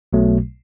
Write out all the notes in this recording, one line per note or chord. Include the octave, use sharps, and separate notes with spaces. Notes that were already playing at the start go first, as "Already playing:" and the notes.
B1 B2 F#3 A3